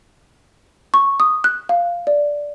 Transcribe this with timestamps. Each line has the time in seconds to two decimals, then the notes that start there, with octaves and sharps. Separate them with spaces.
0.94 C#6
1.20 D#6
1.44 F#6
1.69 F5
2.07 D5